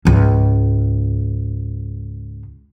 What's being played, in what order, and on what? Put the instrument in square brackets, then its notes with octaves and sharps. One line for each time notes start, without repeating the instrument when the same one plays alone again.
[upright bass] C#2 G#2